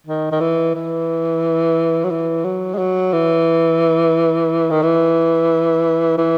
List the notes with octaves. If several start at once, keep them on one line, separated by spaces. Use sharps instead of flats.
D#3
D#3
E3
E3
F#3
E3
F#3
G#3
F#3
E3
D#3
E3
E3